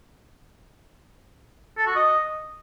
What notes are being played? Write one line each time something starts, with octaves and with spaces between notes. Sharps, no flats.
A4
F#4
D#5